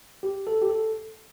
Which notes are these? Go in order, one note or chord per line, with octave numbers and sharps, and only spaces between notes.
G4
A4
G4
A4